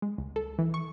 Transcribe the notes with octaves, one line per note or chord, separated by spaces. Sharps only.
G#3
C#2
A4
E3
C#6